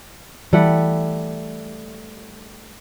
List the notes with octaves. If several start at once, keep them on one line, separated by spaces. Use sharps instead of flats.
E3 G3 A3 F#5